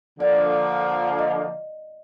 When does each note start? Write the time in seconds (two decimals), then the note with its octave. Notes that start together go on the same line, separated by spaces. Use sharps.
0.20 D3 F3 A#3 D5
1.00 F5
1.19 D#5